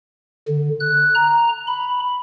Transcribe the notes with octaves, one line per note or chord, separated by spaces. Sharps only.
D3
F#6
A#5
B5